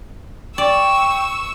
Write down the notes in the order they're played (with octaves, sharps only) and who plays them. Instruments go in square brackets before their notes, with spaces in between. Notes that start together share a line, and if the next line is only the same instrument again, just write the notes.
[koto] D5 [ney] G5 [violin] C#6 E6